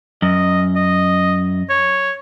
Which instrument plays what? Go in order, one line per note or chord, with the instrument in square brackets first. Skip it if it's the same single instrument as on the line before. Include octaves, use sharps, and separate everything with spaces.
[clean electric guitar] F#2 [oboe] D#5
[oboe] D#5
C#5